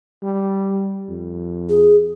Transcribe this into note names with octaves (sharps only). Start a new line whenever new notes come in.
G3
F2
G#4